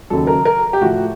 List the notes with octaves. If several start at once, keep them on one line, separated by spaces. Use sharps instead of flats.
D#2 C#3 F#3 A4
A#4
A#4
G4
A2 F3 F#4